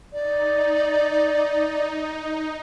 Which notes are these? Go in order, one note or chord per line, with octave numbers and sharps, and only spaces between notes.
D#4 D5